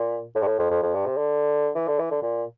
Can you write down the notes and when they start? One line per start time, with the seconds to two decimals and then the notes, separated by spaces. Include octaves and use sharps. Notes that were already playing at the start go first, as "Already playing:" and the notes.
Already playing: A#2
0.35 A2
0.42 G2
0.47 A2
0.59 F2
0.70 F2
0.83 F2
0.94 G2
1.06 C3
1.17 D3
1.75 E3
1.87 D3
1.99 E3
2.11 D3
2.22 A#2